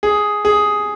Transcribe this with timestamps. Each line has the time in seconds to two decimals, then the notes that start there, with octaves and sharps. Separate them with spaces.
0.03 G#4
0.45 G#4